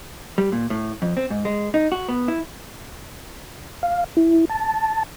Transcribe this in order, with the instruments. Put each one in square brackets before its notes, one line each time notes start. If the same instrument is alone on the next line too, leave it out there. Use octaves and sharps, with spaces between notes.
[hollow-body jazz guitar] G3
A#2
A2
F2
C4
G#2
G#3
D#4
F#4
B3
E4
[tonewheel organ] F5
E4
A5